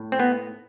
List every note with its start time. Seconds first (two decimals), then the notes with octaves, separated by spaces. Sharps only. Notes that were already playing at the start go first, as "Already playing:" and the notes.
Already playing: A2
0.12 C4
0.20 B3